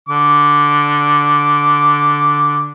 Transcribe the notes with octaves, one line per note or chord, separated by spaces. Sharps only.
D3 D6